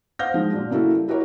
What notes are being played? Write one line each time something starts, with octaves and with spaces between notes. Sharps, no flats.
C5 F5 F#5 F6 G6 A#6
D#3 F3 G#3
A#2 F#3 D4
C#3 A#3 E4 F#4 A4
G3
E4 F#4 G4 A#4 C#5